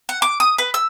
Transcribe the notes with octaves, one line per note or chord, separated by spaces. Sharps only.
F#5
D6
D#6
B4
E6